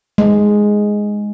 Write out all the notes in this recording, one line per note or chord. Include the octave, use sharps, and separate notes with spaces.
G#3